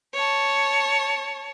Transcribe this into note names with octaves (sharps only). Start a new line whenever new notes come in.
C#5 A5